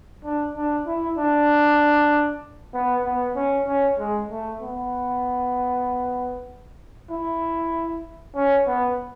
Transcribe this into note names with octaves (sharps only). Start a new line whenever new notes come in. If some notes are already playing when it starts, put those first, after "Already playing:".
D4
D4
E4
D4
B3
B3
C#4
C#4
G#3
A3
B3
E4
C#4
B3